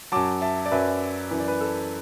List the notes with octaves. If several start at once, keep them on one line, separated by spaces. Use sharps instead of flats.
F#2 F#3 A5 D6
E5 A5
D5
F#2 F#3 B4 E5
F#2 E3 B4
D5
B4
A4